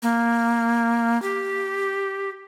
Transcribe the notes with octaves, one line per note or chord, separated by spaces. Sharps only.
A#3
G4